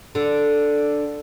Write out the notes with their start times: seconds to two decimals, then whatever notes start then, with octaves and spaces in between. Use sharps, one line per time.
0.15 D3